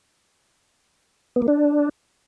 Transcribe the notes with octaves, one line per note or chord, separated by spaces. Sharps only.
B3
A#3
D4